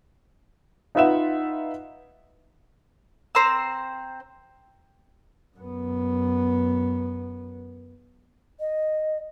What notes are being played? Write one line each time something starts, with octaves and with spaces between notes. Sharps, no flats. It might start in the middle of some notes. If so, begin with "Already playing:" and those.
D#4 F4 B4 E5 F#5 E7
C4 C5 A#5 E6
F#2 B3
D#5